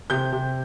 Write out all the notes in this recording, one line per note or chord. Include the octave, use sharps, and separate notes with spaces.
C3 G6
C3